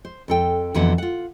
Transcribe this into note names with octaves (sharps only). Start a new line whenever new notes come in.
C5
F2 A4 G5
F2 D3 E3 F#3 B3 F#5
F4 F#5